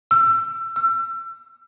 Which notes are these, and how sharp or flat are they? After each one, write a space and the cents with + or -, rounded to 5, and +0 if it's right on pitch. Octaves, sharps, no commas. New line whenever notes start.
E6 +30
E6 +35